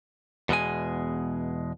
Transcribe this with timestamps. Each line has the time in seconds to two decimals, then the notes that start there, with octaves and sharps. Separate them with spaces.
0.49 E2 B2 G#3 G#5